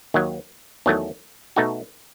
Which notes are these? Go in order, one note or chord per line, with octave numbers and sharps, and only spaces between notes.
D#2 D#3 F#3
E2 D#3 F#3 A3
B2 A3 D#4 F#4